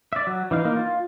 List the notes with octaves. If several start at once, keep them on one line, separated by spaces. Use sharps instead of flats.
D5 E5
F#3
E3 D#4 F5
A#3 D#4
F4